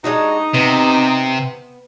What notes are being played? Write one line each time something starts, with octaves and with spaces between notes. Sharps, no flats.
G#3 D4 D#4 F#4
C3 B3